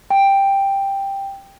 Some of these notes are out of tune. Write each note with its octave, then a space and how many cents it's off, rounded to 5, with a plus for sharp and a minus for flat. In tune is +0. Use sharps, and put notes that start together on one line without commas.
G5 +5